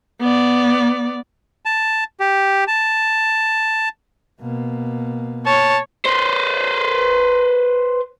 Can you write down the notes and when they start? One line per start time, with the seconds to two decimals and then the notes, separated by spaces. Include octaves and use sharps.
0.20 B3 D5
1.65 A5
2.20 G4
2.68 A5
4.41 B2 A#3
5.46 C#5 A5
6.06 B4 C5